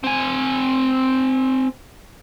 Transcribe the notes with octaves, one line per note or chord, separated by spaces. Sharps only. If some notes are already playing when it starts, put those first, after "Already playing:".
C4 G#5